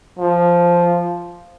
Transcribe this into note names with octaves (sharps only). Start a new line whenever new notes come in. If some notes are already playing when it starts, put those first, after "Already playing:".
F3